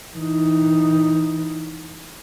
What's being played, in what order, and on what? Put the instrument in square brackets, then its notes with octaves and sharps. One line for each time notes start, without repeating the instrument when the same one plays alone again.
[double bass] E3 D#4